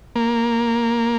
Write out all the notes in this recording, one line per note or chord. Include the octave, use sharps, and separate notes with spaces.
A#3